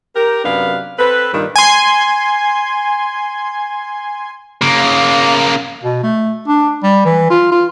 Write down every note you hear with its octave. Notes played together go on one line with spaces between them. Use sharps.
G4 A#4
F#2 C3 B3 D4 F5
C4 A4 B4
G2 A#2 D#3 G3
G#5 C6
C#3 A#3
B2
A3
D4
G3
E3
F4
F4